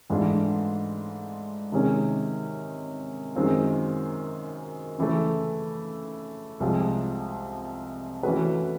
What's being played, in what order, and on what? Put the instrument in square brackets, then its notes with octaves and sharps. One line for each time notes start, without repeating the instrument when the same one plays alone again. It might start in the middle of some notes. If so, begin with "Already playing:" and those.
[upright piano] G#2 E3 A3 D4 F4
C3 D#3 G#3 C#4
F#2 D#3 G#3 C4 F4
C#3 E3 A3
C2 C3 F3 G#3
E3 A3 C#4 F#4 B4